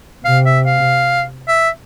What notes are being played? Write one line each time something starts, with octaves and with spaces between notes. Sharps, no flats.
C3 F5
E5
F5
E5